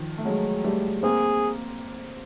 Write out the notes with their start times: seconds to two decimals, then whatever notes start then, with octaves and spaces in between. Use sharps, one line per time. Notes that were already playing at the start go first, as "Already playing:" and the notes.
Already playing: D#3 F3
0.18 A3
0.25 F#3 G#3
0.64 G3 A3
1.03 A#3 C4 G#4